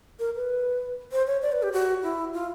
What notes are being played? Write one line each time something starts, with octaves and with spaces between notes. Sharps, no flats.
A#4
B4
C5
C#5
D5
B4
G4
F#4
E4
F4